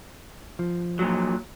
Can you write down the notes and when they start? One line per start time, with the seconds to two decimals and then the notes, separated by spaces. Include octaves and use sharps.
0.59 F3
0.99 A#2 F#3